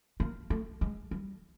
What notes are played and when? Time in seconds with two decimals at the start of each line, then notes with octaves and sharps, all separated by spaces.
0.20 A#3
0.50 A3
0.81 G#3
1.11 G3